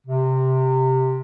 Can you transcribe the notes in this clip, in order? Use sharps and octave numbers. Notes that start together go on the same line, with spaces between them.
C3